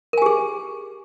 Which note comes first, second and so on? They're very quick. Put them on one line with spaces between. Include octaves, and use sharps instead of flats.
A#4 G#5 G4 G#4